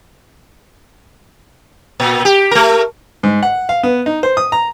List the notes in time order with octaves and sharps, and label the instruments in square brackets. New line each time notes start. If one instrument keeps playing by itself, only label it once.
[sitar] A#2
G4
A3 A#4
[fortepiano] G#2
F#5
F5
B3
D#4
C5
D#6
A#5